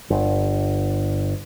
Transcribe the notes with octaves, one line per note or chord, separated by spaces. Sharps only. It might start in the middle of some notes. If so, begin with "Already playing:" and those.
G1